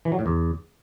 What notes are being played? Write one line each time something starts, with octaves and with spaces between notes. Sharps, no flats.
E3
F#3
A2
E2